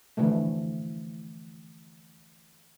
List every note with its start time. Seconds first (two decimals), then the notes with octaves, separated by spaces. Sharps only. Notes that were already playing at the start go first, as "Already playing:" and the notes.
0.17 D3 E3 F3 A3